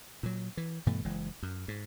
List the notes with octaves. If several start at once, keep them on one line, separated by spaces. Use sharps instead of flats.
A#2 F#3
E3
G2 B2 E3 A3
F#1 E3 G#3
F#2
G#2